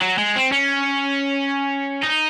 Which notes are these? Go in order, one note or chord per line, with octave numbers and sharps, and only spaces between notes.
F#3
G#3
C4
C#4
D#4